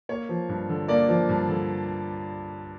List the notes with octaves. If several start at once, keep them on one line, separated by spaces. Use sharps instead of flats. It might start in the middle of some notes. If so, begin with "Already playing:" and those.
A#3 C#5
F3
G2
D3
A#3 D5
F3
G2
D3